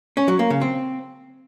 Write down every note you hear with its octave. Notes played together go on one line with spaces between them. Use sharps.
C#4
F#3
A#3
C#3
C4